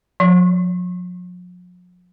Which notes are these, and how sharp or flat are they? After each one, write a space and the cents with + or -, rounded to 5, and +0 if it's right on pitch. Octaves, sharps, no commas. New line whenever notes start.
F3 +45